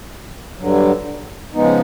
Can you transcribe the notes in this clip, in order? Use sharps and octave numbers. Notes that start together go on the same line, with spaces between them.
G2 D3 F#3
C#3 F3 G#3 B3 D#4